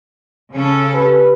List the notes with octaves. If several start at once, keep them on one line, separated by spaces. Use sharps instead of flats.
C#3 C#4 A4
G4 B4